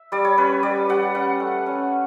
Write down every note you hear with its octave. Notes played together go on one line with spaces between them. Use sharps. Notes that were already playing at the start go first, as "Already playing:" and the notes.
Already playing: E5
G3 D5
C#5
C#4 B4
G3 D5
G3 F#5
C#4 F#5
A3
C#4